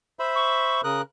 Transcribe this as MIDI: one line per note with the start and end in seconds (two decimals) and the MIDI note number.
0.19 0.81 72
0.19 0.81 76
0.19 0.81 83
0.35 0.84 85
0.84 1.02 49
0.84 1.02 70
0.84 1.01 87
0.84 1.02 90